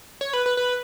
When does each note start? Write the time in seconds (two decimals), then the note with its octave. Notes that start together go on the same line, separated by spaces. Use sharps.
0.21 C#5
0.33 B4
0.46 B4
0.57 B4